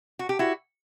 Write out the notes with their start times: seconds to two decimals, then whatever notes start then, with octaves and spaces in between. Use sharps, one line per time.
0.19 F#4
0.29 G4
0.39 E4 F#4